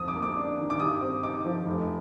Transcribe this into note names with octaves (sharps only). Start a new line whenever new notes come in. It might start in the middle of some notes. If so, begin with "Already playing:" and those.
Already playing: F2 D#6
D6
A#3
D6
D4
D#3
D6
G2 D#6
C4
D#4 D6
F3
F1